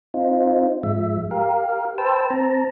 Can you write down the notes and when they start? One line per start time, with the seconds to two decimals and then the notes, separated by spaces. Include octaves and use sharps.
0.14 C4 D#4 F4
0.83 G#2 F3 G#3 E5
1.31 G4 A#4 F5
1.98 B4 C5 G5 A5 E6
2.30 C4 A5 A#5